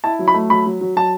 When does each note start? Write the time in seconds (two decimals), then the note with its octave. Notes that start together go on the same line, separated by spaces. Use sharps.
0.04 E4 A5
0.19 F#3
0.28 B5
0.34 A3
0.50 F#3 B5
0.66 F#3
0.81 F#3
0.96 F#3 A5